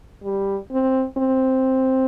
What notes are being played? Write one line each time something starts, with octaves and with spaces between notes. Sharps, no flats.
G3
C4
C4